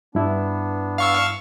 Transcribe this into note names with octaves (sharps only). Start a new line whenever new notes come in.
G2 B3 D4 E4
F5 C#6 E6